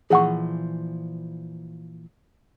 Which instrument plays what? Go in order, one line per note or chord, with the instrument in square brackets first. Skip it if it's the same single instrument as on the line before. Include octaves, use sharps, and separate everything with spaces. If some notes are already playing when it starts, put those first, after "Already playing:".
[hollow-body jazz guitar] A#2 E3 F3 [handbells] G#4 F#5 C#6